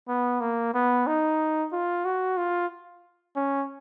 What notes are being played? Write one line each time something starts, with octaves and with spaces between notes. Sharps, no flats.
B3
A#3
B3
D#4
F4
F#4
F4
C#4